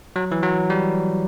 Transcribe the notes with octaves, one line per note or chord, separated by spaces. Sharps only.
F#3
E3
F#3
G3